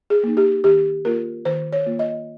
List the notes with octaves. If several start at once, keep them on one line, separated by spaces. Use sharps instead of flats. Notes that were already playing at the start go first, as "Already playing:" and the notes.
G#4
A#3 D#4
G4
D#3 G4
A#3 F4 A#4
D#3 C5
C#5
A#3 F4
D#5